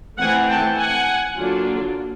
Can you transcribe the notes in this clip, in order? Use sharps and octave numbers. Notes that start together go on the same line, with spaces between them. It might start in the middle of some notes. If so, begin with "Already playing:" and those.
E3 A3 C4 F#5 G#5
G5 A5
F#5 G#5
D3 F#3 A#3 D4 F4